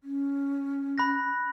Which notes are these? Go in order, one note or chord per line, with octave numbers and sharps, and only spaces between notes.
C#4
B5 F#6 A#6